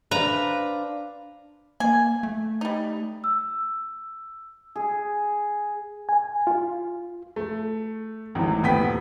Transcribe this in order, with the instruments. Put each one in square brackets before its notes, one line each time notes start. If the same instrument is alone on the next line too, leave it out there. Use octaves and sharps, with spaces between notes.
[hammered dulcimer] D4 C5 F5 [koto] B4 A#5
[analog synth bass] A#3 [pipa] G#5
[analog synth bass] A3
[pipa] G3 D#4
[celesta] E6
[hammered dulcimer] G#4
[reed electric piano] G#5
F4
[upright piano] A3
G#1 E2 A2
D#1 B3 G5 B6